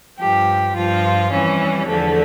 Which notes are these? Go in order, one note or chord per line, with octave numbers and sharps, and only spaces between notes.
G2 F3 G4
G2 F3 F4
F2 E3 G3 C#4
E2 D3 F3 A3